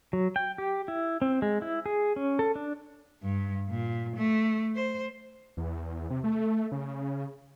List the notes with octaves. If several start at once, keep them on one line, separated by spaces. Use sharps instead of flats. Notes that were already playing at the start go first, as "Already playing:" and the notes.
F#3
G5
G4
E4
C4
G#3
E4
G#4
C#4
A4
D4
G2
A#2
A3
C5
E2
C3
A3
C#3